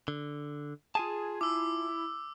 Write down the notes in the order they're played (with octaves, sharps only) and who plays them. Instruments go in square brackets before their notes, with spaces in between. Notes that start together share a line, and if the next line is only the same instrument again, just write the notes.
[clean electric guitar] D3
[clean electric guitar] F4 G#5 A5 [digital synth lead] G#4
[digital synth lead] E4 [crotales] D6 E6